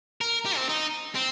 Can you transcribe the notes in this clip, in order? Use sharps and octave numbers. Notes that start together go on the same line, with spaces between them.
A#4
G4
C4
D#4
C4